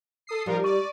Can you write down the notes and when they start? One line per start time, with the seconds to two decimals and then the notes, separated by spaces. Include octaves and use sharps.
0.27 A4 D#6 C7
0.46 F3 G3 D#4 F4 G4 A#4
0.64 D5 C#6